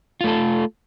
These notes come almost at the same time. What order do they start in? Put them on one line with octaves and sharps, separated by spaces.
F4 A3 A4